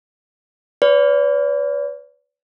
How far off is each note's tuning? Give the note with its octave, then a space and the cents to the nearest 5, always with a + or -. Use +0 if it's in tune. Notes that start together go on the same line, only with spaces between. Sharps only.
B4 +20 D5 -45